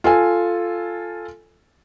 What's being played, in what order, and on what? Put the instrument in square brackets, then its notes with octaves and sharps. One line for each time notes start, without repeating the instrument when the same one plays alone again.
[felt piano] F4 A4 G#5